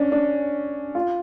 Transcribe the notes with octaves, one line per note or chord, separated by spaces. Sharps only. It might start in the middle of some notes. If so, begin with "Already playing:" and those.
Already playing: C#4 D4
D4
F4